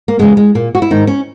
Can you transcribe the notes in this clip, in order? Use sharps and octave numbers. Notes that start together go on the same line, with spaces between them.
A#3
E2 C#3 E3 G#3
G#3
A#2 A#3
F#4
E4
G#2 D#3 D#4
C#4